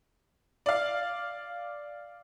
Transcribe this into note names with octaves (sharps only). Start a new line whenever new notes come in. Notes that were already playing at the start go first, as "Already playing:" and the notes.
D5 F5